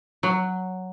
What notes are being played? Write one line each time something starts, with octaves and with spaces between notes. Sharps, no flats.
F#3